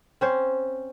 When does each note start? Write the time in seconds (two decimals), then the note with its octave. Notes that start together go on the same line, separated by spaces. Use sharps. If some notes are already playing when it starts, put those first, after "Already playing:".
0.21 C4 C#4 C5